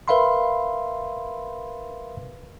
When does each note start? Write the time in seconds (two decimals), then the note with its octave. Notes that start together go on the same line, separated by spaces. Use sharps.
0.08 A#4 B4 E5 F5 B5 C6